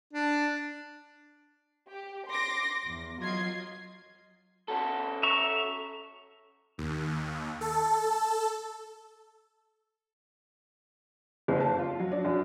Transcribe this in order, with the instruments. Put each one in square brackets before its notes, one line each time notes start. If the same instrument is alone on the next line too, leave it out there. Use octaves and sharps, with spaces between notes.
[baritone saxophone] D4
[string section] G4
C6 D6 A#6
E2
F#3 F4 D#5 G#6 C7
[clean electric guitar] C#4 F#4 A4
[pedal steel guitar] E5 A#5 C#6
[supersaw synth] D#2
A4
[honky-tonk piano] F#1
A5
F4
F#3
D4
F#2